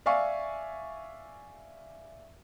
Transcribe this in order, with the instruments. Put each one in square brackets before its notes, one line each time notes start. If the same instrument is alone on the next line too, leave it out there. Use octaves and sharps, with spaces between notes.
[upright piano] D5 E5 F5 G#5 C#6